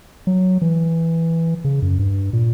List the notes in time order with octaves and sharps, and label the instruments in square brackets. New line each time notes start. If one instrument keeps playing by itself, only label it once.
[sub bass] F#3
E3
C#3
F#2
G2
A#2